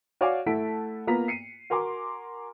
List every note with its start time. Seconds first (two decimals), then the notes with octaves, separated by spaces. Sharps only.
0.21 F#4 C#5 D5 F5 G#5 D6
0.46 A3 E4 F#5 A5 B6 D7
1.07 A#3 B3 F4 A#5 B6
1.28 C7 C#7 D#7
1.70 F#4 A#4 G#5 C6 D6